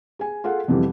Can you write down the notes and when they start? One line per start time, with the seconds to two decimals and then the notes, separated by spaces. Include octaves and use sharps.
0.19 G#4 G#5
0.44 F4 G#4 A4 F#5
0.68 F2 C3 E3 G3